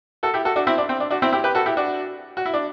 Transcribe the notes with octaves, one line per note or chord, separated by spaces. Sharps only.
F#4 A4
E4 G4
F#4 A4
D4 F#4
C4 E4
D4
C4
D4
D4 F#4
C4 E4
E4 G4
G4 B4
F#4 A4
E4 G4
D4 F#4
F#4
E4
D4